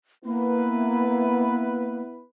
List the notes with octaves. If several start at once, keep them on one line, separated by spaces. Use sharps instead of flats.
A#3 B3 E4 B4